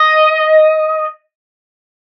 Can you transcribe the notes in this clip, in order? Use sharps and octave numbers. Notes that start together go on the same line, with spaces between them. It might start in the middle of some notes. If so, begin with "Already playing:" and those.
Already playing: D#5